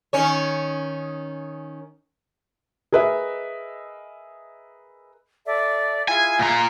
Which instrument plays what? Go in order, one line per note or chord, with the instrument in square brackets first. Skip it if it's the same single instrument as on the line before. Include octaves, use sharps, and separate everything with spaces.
[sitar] D#3 C#4 C#5
[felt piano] G#4 A#4 B4 D#5 E5
[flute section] A4 D5 E5
[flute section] E4 F4 G#4 [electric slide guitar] G#5
[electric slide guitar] A#2 A#5